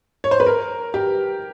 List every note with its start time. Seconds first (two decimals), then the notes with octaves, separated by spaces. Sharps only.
0.24 C#5
0.31 C5
0.40 B4
0.46 A#4
0.94 G4